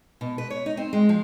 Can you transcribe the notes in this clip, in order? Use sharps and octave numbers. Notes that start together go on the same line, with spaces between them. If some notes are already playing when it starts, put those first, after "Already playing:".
B2
B4
C#5
D#4
C4
G#3
F3